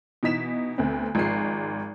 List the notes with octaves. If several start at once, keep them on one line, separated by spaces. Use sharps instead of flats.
B2 E3 D#4 B6 E7
D2 B3 C4
G#1 F3 G#3 C7